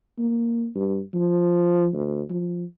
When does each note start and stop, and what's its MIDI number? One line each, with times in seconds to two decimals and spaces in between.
0.19 0.68 58
0.75 1.00 43
1.14 1.88 53
1.94 2.22 38
2.30 2.64 53